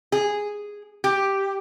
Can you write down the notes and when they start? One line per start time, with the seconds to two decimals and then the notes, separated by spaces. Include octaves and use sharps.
0.12 G#4
1.04 G4